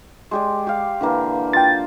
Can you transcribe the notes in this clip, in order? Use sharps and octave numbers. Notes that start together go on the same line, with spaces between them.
G#3 G4 D5
G4 F5
D3 E3 A#3
F4 G5 A6